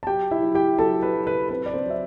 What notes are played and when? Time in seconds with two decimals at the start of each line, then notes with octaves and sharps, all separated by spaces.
0.03 A5
0.07 F#3 G4 G5
0.31 E4 E5
0.43 F#3
0.54 G4 G5
0.79 F#3 A4 A5
1.02 B4
1.14 F#3
1.27 B4
1.49 C4 B4
1.66 D5
1.74 C4 C5
1.86 F#3 E5